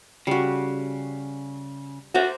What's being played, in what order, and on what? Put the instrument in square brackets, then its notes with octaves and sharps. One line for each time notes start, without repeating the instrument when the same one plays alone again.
[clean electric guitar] C#3 [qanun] G3 F#4
[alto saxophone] F#4 [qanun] C5 A#5 D6